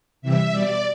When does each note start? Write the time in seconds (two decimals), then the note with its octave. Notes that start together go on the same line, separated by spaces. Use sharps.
0.22 C3 E3 G3 E5
0.50 B2 G3 D5